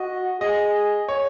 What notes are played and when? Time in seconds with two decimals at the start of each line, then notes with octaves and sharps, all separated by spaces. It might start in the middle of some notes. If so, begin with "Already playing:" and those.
Already playing: F#4 D#5
0.40 G#4 D#5
1.08 C#5